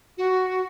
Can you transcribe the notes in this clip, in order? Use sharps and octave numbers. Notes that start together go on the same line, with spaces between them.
F#4